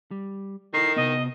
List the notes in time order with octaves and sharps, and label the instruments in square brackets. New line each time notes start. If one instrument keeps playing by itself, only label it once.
[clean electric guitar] G3
[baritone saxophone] D#3 [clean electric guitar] E4 A4 A#4 [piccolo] C7
[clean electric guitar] C3 B3 [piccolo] D#5